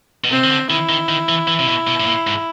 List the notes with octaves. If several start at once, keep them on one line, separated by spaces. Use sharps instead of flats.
B2
C3 C4
D#3
D3
D#3 E4
D#3
D#3
E3
E3
C3
B2
B2
A2
A#2
G#2